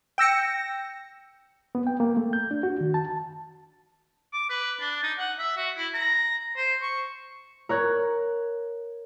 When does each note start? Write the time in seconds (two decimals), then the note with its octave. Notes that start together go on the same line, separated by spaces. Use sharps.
0.18 G5 E6 A#6 C#7
1.75 B3
1.87 G5
2.00 A#3
2.17 A3
2.33 G6
2.51 D4
2.63 F#4
2.81 D#3
2.94 A5
4.33 D6
4.50 B4
4.80 D4
5.03 D#4
5.18 F#5
5.39 E5
5.57 F#4
5.77 E4
5.94 A#5
6.57 C5
6.82 C#6
7.69 A#4 C#5 F#6 G#6